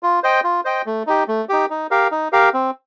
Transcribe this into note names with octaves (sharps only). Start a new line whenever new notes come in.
F4
C5 D#5 G5
F4
C5 D#5 G5
A3
D#4 G4
A3
D#4 G4
D#4
G4 A#4 F5
D#4
G4 A#4 F5
C4